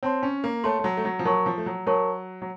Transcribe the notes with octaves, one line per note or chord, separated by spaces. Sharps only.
C4 C#5 A5 C6
C#4
A#3
A3 C#5 A5 C6
A3
F#3
A3
F#3
F3
F#3 A#4 C#5 A5 C#6
F3
A3
F#3
F#3 A#4 C#5 A5 C#6
F#3